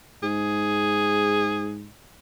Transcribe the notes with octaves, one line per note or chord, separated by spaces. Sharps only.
G#2 G#4